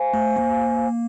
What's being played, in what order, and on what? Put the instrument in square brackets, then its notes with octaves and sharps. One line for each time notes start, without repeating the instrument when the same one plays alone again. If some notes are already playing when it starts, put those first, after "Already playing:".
Already playing: [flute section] C5 F5 G#5
[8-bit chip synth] A3
A#3